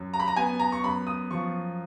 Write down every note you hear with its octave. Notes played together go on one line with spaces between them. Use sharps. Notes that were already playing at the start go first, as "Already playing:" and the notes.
Already playing: F#2
A#5
B5
A#5
B3 G#5
A#5
C#6
F#2 B5
D#6
F3 C#6